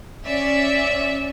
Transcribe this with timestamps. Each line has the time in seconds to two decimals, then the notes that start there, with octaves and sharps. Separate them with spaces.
0.24 C#4 D5 E5